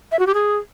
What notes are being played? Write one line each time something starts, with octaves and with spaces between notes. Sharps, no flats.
E5
F#4
G4
G#4